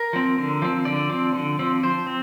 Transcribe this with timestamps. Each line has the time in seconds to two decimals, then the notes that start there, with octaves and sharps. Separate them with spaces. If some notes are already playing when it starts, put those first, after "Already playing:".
Already playing: A#4
0.13 F3 C4
0.38 D3
0.62 F3 C4
0.85 D3 D5
1.10 F3 C4
1.35 D3
1.59 F3 C4
1.83 F3 C5
2.06 C4